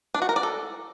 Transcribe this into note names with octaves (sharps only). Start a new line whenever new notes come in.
D4
F#4
A#4
D5
A4